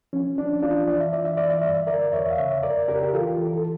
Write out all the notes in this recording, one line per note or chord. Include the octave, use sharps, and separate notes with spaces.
F3 C#4
F3 D4
E3 D4 F4
E3 D5
E5
E3 D5
E5
E3 D5
E5
G2 D5
E5
D3 A#4 D5
E2 C#5 E5
F5
C#3 C#5 E5
F2 A#4 D5
C#3 G4 A#4
G4
E3 F4 A4
E3
A4